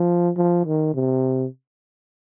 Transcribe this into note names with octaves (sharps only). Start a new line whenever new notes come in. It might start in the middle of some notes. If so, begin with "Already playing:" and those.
Already playing: F3
F3
D#3
C3